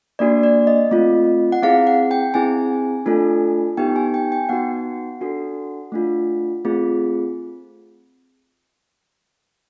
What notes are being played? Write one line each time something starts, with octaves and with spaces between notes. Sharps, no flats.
A#3 D4 F#4 D5
D5
D#5
A3 C4 F4
F#5
C4 E4 G#4 F5
F#5
G5
C4 E4 G#4 G#5
A3 D4 F4 A4
B3 D#4 G4 G5
G#5
G5
G5
B3 D#4 F#4 F#5
D4 F#4 A4
A3 D4 F4
A3 C4 F4 G#4